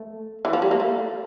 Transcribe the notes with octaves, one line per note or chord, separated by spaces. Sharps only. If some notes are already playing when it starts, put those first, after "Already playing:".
Already playing: A3
E3
F3
G3
A#3
A3